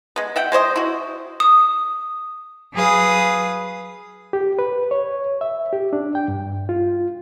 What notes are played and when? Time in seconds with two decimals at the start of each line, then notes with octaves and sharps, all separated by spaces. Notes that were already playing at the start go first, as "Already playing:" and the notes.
0.16 G#3 B3
0.36 E5 F#5 G5
0.52 G#3 C5 C#5 D#5
0.76 E4 F#4
1.40 D#6
2.73 F#3 G#4 B4 F5 D#6
4.33 G4
4.59 B4
4.91 C#5
5.41 E5
5.73 G4
5.93 D4
6.15 G5
6.28 G2
6.69 F4